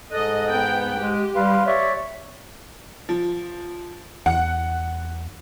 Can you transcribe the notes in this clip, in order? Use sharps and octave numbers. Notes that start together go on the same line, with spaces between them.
G#2 A4 D#5 F#6
B3 G5
G#3 G4
G3 B4 F5 C6
C#5 D5 E5
F3
E2 F#5